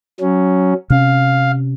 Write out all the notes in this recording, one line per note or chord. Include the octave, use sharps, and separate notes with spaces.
F#3 C#4
C3 C#4 F5